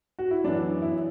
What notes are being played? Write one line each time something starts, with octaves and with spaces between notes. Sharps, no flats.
F#4
E4
F#2 E3 B3 D4
E4